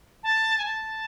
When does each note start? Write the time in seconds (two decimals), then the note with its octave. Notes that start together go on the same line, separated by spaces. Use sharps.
0.23 A5
0.58 G#5
0.64 A5